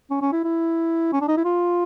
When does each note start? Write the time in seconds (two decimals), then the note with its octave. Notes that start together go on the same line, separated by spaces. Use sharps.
0.11 C#4
0.22 C#4
0.33 E4
0.44 E4
1.13 C#4
1.21 D4
1.28 D#4
1.37 E4
1.45 F4